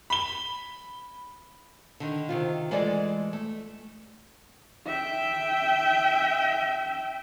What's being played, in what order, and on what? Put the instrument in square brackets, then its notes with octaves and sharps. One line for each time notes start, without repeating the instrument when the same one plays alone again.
[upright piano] B5 G7
[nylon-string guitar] D3 D#3
C3 D#3 F4
E3 G#3 A3 F4 A4 D5
A3
[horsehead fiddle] E5 G5